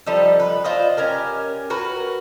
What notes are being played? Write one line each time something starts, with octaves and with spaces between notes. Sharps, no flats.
F3 G3 D#4 A4
B4
F4 C5 D5 D#5
C#4 G4 A#4
F#4 A#4 B4